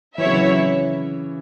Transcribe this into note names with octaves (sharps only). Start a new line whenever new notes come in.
E3 F#3 E4 C#5 E5
C#3
E3